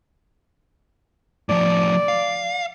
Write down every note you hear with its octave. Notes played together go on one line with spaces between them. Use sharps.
A2 F3 D5
F5